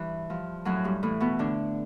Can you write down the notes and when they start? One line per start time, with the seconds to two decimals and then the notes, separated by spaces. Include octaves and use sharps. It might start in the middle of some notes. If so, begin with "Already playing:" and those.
Already playing: G2 E3
0.30 G2 F3
0.65 F#2 A2 F#3
0.84 G2 G3
1.03 A2 E3 A3
1.20 B2 B3
1.39 A2 D3 D4